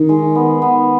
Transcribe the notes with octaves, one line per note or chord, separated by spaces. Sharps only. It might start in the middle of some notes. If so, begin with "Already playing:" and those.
Already playing: D#3
G#3
B3
B3